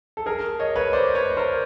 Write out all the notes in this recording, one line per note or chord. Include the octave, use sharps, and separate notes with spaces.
A4
G#4 A#4
C#5 D#5
B4 C#5
C5 D5
B4 C#5
A#4 C5